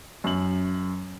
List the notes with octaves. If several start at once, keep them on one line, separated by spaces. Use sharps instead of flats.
F#2 F#7